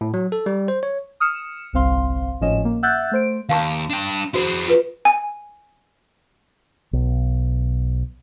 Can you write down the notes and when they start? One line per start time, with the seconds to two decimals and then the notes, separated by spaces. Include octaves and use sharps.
0.01 A2
0.14 F#3
0.32 A4
0.46 G3
0.68 C5
0.83 C#5
1.20 D#6 F6 C#7 E7
1.73 G1 C2 C4 F5 C6
2.41 G#1 A2 F3 C#4 D#5 E7
2.65 A#3
2.83 E5 F#5 E6 F#6 G6 A6
3.11 A3 C5 D7
3.49 D#2 F5 A5 C#6
3.90 D4 G5
4.34 E4 F#4 G#4 C5
4.68 F4 B4
5.05 G#5
6.93 B1